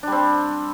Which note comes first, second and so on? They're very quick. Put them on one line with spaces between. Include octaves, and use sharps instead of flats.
D4 G3 C4